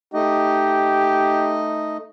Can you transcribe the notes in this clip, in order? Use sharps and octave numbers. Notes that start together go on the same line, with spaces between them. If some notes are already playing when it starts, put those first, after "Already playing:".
A3 D#4 G4 D#5